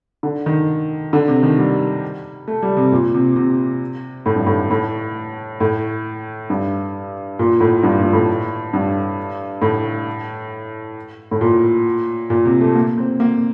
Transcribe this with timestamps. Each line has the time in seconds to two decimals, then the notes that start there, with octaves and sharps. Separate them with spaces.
0.23 D3
0.46 D#3
1.13 D3
1.28 C3
1.43 D#3
1.58 G3
2.48 A3
2.62 G3
2.77 C3
2.92 A#2
3.14 C3
3.36 C3
4.26 A2
4.36 G2
4.46 A2
4.71 A2
5.60 A2
6.50 G2
7.39 A#2
7.60 A2
7.83 G2
7.99 A#2
8.13 A2
8.73 G2
9.62 A2
11.31 A2
11.41 A#2
12.30 A#2
12.45 C3
12.61 A3
12.75 A#3
12.97 C4
13.20 A#3